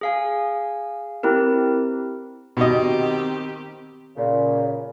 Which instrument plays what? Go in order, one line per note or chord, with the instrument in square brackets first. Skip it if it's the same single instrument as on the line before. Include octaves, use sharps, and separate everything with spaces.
[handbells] G#4 F5 G#5
C4 E4 G4 A#4
[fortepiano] B2 D#5 [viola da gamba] D#3 C4 G4
[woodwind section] A#2 C#3